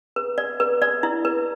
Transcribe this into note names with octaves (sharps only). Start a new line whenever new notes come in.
B4
D5
B4
D5
E4
B4